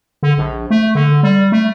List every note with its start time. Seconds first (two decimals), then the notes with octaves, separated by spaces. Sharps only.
0.23 D3
0.38 A#1
0.71 A3
0.95 D3
1.23 G3
1.52 A3